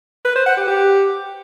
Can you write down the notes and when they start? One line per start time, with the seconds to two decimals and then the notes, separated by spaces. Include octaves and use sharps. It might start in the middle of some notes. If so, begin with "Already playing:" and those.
0.25 B4
0.35 C5
0.46 F#5
0.57 G4
0.67 G4